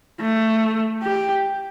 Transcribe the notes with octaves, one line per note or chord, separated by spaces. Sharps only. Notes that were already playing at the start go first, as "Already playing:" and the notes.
A3
G4